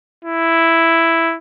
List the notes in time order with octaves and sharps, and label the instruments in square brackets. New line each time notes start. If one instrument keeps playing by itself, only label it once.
[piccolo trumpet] E4